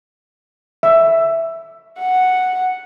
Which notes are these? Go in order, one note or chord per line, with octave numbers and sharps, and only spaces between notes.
E5
F#5